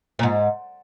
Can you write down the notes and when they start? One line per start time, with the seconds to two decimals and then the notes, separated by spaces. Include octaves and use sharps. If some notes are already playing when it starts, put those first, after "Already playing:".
0.19 A#2
0.23 G#2